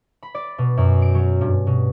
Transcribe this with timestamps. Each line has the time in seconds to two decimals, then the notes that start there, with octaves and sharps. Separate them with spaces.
0.23 B5
0.35 D5
0.58 B2
0.77 F#2
1.02 D7
1.15 F#3
1.41 G2
1.67 B2